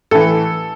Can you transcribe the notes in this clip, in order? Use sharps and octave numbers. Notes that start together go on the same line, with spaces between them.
A2 E3 A4